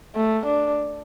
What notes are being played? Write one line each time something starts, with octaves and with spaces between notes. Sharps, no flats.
A3
D4